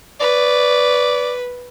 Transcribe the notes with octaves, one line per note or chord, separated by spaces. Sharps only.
B4 D5